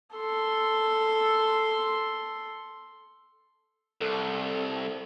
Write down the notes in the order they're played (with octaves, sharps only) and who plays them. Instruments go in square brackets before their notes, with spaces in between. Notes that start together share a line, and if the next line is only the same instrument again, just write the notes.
[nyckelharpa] A4 C6
[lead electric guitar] C2 [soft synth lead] A4